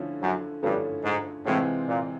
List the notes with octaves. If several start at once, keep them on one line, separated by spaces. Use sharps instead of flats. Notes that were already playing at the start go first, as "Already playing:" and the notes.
Already playing: D3 F3 A3 C#4 E4
F#2
G2 D3 F3 A3 C#4 E4
G#2
A2 C3 E3 G#3 C4 F4
A#2